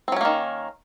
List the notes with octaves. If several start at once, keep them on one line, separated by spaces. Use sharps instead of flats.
D#3 F#3 A#3 C4 C#4